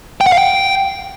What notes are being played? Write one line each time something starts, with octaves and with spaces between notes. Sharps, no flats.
G5
F#5
F5
G5